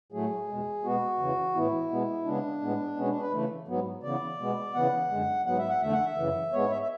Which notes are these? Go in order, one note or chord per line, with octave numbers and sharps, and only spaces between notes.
A2 F#3 A3 G#4
E2 B2 G#3
B2 G#3 B3 F#4
E2 C#3 E3
A2 E3 B3 E4
B2 G#3 B3
C#3 G#3 B3 D4
A2 G#3 B3
B2 G#3 B3 C#4
D4
B4
C#3 E3 A3
G#2 F#3 B3
C#3 E3 B3 D5
B2 G#3 B3
C#3 E3 B3 F#5
F#2 D3 G#3
G#2 F#3 B3 F#5
E5
F#5
E2 D3 A3 E5
F#5
E5
F#2 C#3 E3
G#2 G#3 B3 C#5
E5
E5